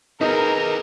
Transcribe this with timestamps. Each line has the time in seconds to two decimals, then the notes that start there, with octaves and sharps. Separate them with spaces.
0.21 D#4 G#4 A#4 B4